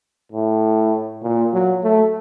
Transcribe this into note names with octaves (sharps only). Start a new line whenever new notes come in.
A2
A#2
F#3
A3